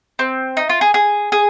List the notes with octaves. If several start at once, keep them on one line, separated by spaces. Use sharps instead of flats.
C4
D#4
F4
G#4
G#4
G#4